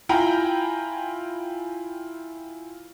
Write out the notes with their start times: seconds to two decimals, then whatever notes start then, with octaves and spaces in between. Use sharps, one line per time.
0.09 E4 F4 G5 G#5 A#5 B5